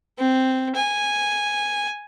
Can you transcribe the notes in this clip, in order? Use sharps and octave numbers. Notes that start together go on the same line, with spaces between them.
C4
G#5